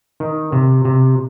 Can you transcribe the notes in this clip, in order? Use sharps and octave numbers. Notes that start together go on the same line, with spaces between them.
D#3
C3
C3